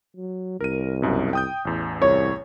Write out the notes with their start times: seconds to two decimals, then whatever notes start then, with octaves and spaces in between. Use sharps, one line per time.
0.17 F#3
0.61 C2 A#4 D#7
1.02 B1 F#2 B2
1.33 G5 D#6 G6
1.65 A1 E2
2.02 C2 C#5